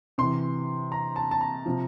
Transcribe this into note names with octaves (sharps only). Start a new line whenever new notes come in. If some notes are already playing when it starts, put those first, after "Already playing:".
C3 E3 C6
A#5
A5
A5
A#5
C3 F3